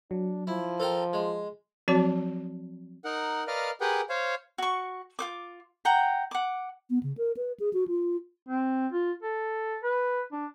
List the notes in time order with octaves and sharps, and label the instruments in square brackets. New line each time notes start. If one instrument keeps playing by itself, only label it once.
[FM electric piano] F#3 [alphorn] D4
[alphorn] F3 [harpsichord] E4
[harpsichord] A4 A#4 G5 [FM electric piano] C5
[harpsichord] G#3
[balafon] F3 F#3 C4 F#4 C#5 A5
[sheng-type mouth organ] D#4 A#4 F#5
A#4 B4 D5 D#5 F5 F6
G4 G#4 A#4 B4 F#5 G5
C5 C#5 F5
[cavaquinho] F#4 C#6
F4 C5 D6
F#5 G5 A#5
F#5 D6
[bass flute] B3
C#3
A#4
B4
G#4
F#4
F4
[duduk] C4
F4
A4
B4
D4